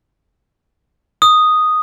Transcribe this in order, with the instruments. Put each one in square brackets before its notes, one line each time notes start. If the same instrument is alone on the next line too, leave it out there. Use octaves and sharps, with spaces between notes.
[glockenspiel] D#6